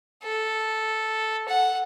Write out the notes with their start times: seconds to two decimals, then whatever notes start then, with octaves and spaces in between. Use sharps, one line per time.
0.24 A4
1.48 F#5